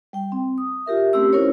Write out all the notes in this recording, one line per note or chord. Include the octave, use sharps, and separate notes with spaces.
G3 G5
C4
D#6
F4 G4 A#4 E5
A3 C4 C#4 G4 E6
C#4 E4 F4 A#4 C5 C#5